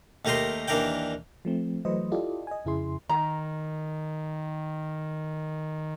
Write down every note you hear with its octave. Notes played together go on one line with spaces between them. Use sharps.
D#2 A3 G4 A#4 D#5 C6
D#2 E3 D4 A#4 D5 G5
F3 A3 C4
E3 F#3 A3 B4 C5 D#5
E4 F4 G4 A4 D5 D#5
D#5 G#5
F2 C#3 E4 G#4 C6
D#3 A#5